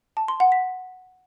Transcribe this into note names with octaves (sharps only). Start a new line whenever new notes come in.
A5
C6
F#5
B6